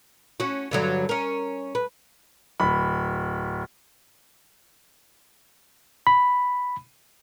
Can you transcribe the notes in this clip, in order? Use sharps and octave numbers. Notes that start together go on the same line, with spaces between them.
C#4 F#4
G2 D3 F#3
C#4 A#4
B4
D1 B5
B5